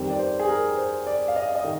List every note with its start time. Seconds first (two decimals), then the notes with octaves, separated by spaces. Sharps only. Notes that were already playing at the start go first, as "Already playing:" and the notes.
Already playing: F2 D#3 G3 C4
0.10 D5
0.19 C5
0.39 G#4
0.48 A#4
0.78 C5
1.07 D5
1.28 F5
1.36 D#5
1.55 D#5
1.64 D#3